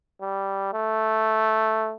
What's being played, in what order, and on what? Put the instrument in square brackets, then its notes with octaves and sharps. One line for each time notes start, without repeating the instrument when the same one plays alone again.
[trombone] G3
A3